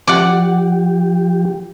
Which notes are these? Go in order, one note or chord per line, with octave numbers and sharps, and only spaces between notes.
F3 G4 D5 F#5